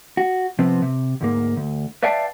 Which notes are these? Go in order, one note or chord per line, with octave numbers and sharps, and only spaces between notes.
F#4
C3 F3 B3 C4
C3
D2 G#2 A#3
D2
B4 D5 E5 F5 G5 A5